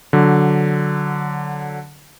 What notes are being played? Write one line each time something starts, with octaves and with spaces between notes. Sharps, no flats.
D3 F#3